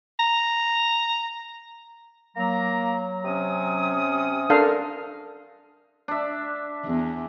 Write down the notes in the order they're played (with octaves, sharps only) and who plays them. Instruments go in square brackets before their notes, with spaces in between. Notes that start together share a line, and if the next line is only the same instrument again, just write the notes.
[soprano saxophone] A#5
[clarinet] F#3 [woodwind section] A#3 A#5
[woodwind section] C3 C#4 D#6
[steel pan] D4 A4 F5 [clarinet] A#4
[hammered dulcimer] D4 E5
[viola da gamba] E2